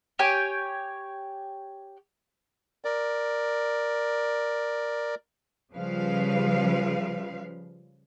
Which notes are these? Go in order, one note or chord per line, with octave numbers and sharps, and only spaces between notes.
G4 C#5 G5 G#5
A#4 D5
C#3 F3 G3 B4 F5